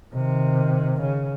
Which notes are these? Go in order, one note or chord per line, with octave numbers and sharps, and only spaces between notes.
C3 D#3
C#3